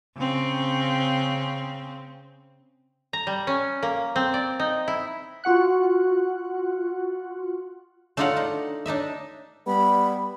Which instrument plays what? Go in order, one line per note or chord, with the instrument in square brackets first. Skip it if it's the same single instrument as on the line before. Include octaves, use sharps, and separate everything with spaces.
[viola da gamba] C#3 C4
[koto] A#5
G3
C#4
A#3
C4
D5
D#4
E4
[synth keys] F4 F#4 F#5 F#6
[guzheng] A3 D4 D#4 F4 F5 F#5
D#4
D4 D#4 D#5 E5
[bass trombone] G3 [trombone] B3 [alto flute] B5